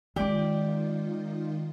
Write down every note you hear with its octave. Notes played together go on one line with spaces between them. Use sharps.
D#3 G#3 C#4 D#4 F4 G4 D5